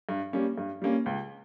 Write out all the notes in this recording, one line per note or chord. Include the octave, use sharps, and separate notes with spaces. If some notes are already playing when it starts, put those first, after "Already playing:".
G2
G3 A#3 C#4
G2
G3 A#3 C#4
C#2